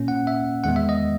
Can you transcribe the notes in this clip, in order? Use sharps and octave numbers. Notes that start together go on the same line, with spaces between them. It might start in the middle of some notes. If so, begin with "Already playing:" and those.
Already playing: A#2 A#3 C#4
F#5
E5
E2 D#3 G#3 B3 F#5
E5
D#5